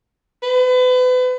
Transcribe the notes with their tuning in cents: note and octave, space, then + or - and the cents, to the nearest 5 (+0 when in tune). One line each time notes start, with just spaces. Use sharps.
B4 +35